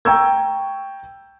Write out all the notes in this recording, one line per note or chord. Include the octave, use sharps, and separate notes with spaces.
G5 A#5 C#6 E6 G6 G#6